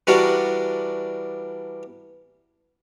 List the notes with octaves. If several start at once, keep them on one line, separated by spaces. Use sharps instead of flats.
E3 G3 D4 F#4 A#4